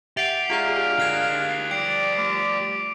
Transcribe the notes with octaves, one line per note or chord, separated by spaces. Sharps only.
G4 E5 F#5 C7 D7 F7
G#3 D4 F4 G#4 F5 A#5
G4 A#4 F#6 G#6
F3 G3 D5 G5 C7 D7
A3 D6